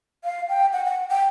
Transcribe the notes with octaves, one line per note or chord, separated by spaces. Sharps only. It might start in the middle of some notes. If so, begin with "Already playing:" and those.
F5
G5
F#5
F#5
G5